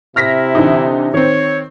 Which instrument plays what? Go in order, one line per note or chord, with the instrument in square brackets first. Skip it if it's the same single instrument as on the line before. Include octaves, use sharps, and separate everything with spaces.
[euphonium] C3 [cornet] E4 [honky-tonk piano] F6 A#6 B6
[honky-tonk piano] D3 E3 D#4
[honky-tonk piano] D#3 C4 [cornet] C#5